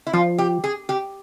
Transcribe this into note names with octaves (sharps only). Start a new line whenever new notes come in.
E4
F3 F4
G4
G#4
G4